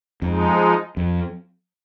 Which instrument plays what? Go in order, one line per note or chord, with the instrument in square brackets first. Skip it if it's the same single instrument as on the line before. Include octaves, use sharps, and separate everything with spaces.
[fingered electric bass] F2 [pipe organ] F3 G#3 D#4
[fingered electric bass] F2